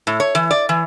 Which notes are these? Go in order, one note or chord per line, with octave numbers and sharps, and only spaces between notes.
A2
C#5
E3
D5
E3